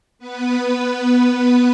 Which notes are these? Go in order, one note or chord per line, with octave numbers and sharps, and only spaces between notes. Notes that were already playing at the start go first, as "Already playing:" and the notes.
B3 B4